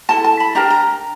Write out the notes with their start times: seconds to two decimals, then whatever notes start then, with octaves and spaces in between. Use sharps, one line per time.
0.09 E4 A4 A5
0.24 A5
0.40 B5
0.55 D4 G4 A#4 A#5
0.70 A#5